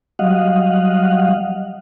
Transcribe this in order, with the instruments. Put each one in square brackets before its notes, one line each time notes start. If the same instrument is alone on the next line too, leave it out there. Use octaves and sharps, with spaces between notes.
[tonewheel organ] F#3 G3 D#5 F5 F#5